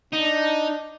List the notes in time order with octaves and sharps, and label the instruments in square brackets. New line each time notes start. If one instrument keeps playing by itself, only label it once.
[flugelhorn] D4 [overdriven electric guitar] D#4